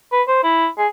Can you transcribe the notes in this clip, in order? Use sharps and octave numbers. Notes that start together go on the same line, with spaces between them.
B4
C5
E4
G#4